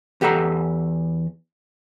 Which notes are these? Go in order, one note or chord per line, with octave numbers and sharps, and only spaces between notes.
E2 G4 A4 F#5 A#5